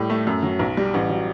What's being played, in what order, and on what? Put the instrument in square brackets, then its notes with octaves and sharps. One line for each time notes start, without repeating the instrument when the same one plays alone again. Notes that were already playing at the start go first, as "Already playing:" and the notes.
Already playing: [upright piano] A2 G3
A3
F#2
F#3
B1
G3
A1
F#3